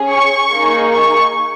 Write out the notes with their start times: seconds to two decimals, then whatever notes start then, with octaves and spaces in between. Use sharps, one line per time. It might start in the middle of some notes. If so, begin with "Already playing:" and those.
Already playing: C#4 G#4
0.12 C#6
0.52 A#3 D#4 G#4
0.91 C#6